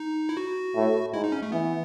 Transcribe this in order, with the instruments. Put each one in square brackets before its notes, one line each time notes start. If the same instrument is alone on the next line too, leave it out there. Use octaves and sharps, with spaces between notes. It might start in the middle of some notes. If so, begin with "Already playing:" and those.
Already playing: [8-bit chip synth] D#4
E4
F#4
[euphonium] A2
[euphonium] G#2 [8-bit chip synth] E4
[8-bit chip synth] D#4
C#4
A3
[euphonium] E3 [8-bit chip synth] B3